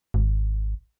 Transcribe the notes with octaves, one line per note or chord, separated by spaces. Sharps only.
G#1